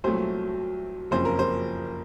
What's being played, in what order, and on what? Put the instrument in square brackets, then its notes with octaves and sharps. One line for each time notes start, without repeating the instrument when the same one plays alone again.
[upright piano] C2 A#2 F#3 A3 C5
F#1 F2 C#3 F3 C5
A#4
C5